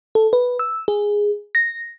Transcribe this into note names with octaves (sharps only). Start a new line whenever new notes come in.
A4
B4
E6
G#4
A#6